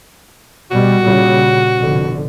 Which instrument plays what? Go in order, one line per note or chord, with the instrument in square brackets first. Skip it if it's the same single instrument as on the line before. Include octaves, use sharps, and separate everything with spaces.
[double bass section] B2 G3 [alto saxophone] F#4
[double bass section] A#2 C#3 G3
F1 B2 D3